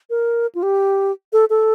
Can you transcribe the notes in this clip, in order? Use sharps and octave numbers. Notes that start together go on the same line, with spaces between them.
A#4
F4
G4
A4
A4